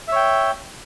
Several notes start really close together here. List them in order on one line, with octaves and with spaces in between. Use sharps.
E5 C#5 G5